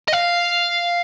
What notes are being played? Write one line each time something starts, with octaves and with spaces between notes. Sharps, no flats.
D#5
F5